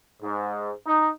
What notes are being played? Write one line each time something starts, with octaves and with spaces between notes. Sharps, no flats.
G#2
D#4